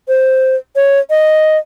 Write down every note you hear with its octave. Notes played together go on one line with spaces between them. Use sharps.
C5
C#5
D#5